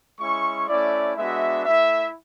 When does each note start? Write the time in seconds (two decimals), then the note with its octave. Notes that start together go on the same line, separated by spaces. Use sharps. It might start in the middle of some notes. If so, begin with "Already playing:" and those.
0.20 G#3 C#4 E4 C#6
0.69 A3 C#4 E4 D5
1.17 G#3 B3 D4 F#4 E5
1.66 A3 E4 E5